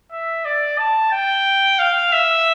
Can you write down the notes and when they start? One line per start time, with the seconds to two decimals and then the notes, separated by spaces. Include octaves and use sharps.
0.12 E5
0.45 D5
0.78 A5
1.12 G5
1.79 F5
2.12 E5